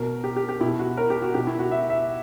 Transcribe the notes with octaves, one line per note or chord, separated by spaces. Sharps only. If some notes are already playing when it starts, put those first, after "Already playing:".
Already playing: B2 A#4
G4
G4
G4
B2 E4
F#4
A#4
G4
F#4
B2 G4
E4
F#4
E5
E5